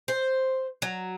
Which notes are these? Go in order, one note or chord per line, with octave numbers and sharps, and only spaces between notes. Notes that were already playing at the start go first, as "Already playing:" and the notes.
C5
F#3